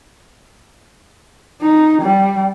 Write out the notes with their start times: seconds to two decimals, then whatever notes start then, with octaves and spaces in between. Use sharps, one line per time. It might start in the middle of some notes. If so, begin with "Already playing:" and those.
1.61 D#4
2.02 G3